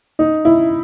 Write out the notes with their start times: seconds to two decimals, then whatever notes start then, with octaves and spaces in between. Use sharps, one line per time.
0.19 D#4
0.45 E4